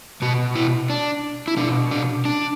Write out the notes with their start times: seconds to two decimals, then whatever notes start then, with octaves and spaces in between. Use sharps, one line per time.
0.22 B2 F#4
0.56 E4
0.90 D4
1.48 E4
1.57 B2 D4
1.91 D4
2.25 D4